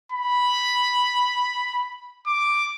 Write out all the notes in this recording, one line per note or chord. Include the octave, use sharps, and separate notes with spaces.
B5
D6